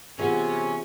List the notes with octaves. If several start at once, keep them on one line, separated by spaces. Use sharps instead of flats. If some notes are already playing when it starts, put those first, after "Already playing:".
C3 E3 B3 C#4 F4 G#4 D5